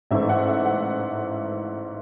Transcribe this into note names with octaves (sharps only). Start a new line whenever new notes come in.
A1 G#2 E3 A3 E4 E5
F#5
E5
F#5